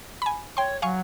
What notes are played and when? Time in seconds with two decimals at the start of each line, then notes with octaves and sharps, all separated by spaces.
0.22 G#5 B5
0.57 C#5 G5 C6
0.82 F#3 F5 G#5 C#6